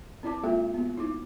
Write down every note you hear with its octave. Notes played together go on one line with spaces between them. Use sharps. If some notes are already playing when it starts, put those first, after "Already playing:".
C4 E4 D5 A5 D6
G#3 A#3 F4 F#4 A4 E5
B3 F#4
D#4 E4 D6